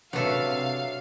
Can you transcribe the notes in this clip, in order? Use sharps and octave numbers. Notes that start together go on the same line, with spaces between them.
C3 F#3 D4 A4 B4 E5 F5